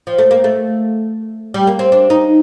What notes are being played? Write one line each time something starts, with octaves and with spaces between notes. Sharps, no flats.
F3
A3
A#3
A3
G3
A#3
C4
D4
D#4